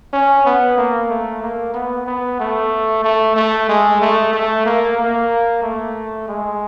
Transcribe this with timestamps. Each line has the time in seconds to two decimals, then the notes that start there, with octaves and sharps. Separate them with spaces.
0.13 C#4
0.46 B3
0.78 A#3
1.10 A3
1.43 A#3
1.74 B3
2.07 B3
2.40 A3
3.04 A3
3.36 A3
3.69 G#3
4.02 A3
4.33 A3
4.66 A#3
4.98 A#3
5.63 A3
6.28 G#3